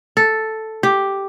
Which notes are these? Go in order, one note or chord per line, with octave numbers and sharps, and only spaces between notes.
A4
G4